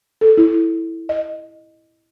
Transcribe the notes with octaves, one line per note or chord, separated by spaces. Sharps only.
A4
E4
D#5